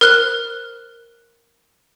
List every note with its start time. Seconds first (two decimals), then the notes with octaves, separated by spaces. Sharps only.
0.01 A#4 C5 F6 F#6 G7